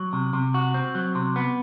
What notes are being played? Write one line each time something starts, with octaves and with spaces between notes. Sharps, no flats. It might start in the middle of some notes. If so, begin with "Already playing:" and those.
Already playing: F#3
C3
C3
F#4
C4
F#3
C3
B3